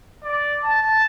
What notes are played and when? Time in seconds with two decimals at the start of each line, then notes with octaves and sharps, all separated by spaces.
0.23 D5
0.64 A5